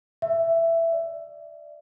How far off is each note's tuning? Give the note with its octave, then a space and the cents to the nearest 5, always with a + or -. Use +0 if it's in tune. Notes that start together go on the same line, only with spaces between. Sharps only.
E5 +10
D5 +15